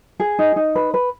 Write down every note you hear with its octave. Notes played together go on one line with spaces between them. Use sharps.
G#4
D#4
D#4
B4
B4